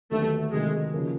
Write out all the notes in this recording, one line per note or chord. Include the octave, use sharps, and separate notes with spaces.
D#2 D3 F#3 A3 B3 D4
C3 D#3 F#3 G#3
C#3 F3 A#3 C#4